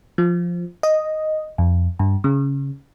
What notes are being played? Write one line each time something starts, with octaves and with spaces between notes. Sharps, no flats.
F3
D#5
F2
G2
C#3